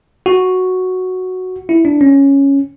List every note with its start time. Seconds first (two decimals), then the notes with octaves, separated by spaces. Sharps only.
0.26 F#4
1.69 E4
1.85 D4
2.01 C#4